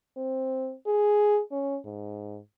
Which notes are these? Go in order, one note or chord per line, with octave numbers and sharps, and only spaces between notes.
C4
G#4
C#4
G#2